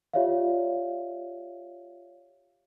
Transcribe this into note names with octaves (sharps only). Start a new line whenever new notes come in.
F4 G4 C#5 D5 E5 F5